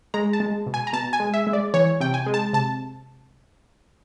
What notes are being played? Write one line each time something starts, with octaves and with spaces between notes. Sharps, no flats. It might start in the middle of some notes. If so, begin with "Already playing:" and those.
G#3 A#5
A5
G#3
B2
G#5
A#5
B2 A5
G#5
G#3
E5
G#3
D5
E3 C#5
C3 G5
G#5
G#3
A5
C3 A5